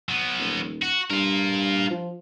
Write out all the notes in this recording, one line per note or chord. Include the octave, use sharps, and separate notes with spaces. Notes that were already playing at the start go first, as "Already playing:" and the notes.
F#3 B3
D#1
F#4
G2 F4 A#4
F3